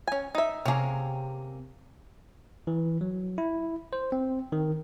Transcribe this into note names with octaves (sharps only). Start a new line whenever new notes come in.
C#4 G#5
D#4 E5
C3 A#3 C#4 G#4
E3
F#3
E4
C5
C4
D#3